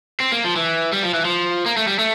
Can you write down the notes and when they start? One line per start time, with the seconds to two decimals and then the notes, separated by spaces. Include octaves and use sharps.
0.20 C4
0.32 A#3
0.44 F3
0.56 E3
0.92 G3
1.03 F3
1.14 E3
1.25 F3
1.66 A#3
1.77 A3
1.87 G3
1.99 A3